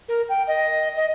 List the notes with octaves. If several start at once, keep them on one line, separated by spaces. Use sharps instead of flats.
A#4
G5
D#5
D#5